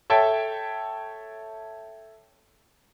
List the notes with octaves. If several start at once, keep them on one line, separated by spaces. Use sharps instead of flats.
A4 C#5 E5 G5 A5